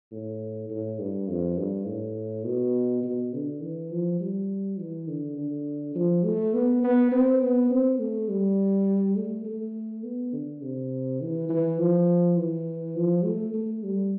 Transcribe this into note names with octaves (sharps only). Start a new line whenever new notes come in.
A2
A2
G2
F2
G2
A2
B2
B2
D3
E3
F3
G3
E3
D3
D3
F3
A3
B3
B3
C4
B3
C4
A3
G3
A3
A3
B3
D3
C3
E3
E3
F3
E3
F3
A3
A3
G3